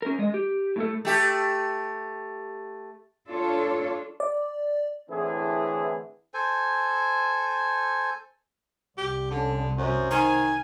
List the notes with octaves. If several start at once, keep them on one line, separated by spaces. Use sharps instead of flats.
C#4 A#4
G#3 D#5
G4
A2 A3 A4
A3 G4
D4 F4 A4 C#5
D5
A2 D3 E3 C4 E4 G#4
A4 C5 G#5
C2 G4
D3 C#4 A4
F#2 C5
D#3 G#5